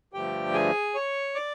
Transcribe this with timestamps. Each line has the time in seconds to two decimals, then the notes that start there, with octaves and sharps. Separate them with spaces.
0.13 G2 D3 F3 A3 G4 G5
0.54 G#4 G#5
0.95 C#5 C#6
1.35 D5 D6